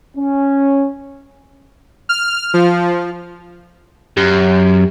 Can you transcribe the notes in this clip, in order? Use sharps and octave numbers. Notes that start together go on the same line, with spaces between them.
C#4
F6
F3
F#2 G4